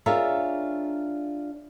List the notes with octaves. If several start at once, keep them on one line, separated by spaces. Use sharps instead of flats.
D4 F4 G#4 A#4 C#5 E5